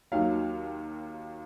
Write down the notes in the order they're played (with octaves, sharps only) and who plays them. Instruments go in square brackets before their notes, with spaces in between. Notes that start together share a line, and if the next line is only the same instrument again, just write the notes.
[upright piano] D#2 D#3 F#3 F5